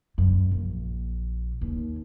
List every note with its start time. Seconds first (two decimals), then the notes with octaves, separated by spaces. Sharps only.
0.18 F#2
0.51 A#1
1.61 D#2